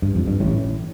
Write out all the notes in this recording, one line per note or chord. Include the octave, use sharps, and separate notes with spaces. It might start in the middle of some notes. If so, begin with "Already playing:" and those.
G2
F2
G2
A1 A2